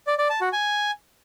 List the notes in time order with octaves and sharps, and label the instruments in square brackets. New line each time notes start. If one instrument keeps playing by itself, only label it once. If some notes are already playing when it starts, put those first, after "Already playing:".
[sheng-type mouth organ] D5
D5
A5
F#4
G#5